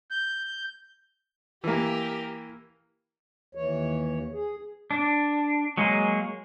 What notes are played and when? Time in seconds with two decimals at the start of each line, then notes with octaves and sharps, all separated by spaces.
0.11 G6
1.64 E3 A#3 G4 A#4
3.55 D#2 E3 C#5
4.32 G#4
4.91 D4
5.77 F#3 G#3 A#3 G#4